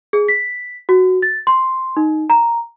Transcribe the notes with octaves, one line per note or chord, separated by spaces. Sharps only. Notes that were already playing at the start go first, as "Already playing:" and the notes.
G#4
B6
F#4
A6
C6
D#4
A#5